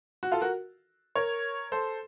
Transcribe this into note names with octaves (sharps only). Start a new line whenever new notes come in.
F#4
F4 A4
F#4 A#4
A#4 C#5
A4 C5